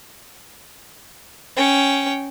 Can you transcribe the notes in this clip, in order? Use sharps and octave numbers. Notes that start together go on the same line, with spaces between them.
C#4 G5